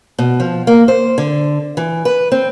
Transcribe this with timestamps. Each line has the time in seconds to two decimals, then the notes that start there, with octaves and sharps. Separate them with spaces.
0.19 B2
0.40 F3
0.67 A#3
0.88 C5
1.18 D3
1.77 E3
2.05 B4
2.32 C4